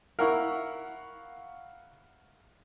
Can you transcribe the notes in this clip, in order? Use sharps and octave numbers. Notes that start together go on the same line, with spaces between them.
E4 A#4 F5 F#5 C#6